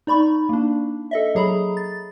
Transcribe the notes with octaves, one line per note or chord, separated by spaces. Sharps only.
D#4 D5 B5 C#6
A#3 D4
A4 D#5 E5
F#3 G#4 A#5 B5
A6